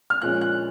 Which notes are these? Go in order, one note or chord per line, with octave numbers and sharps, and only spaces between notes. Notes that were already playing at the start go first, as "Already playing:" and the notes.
F6
A#2 F3 G#3 C#4 F#6
F#6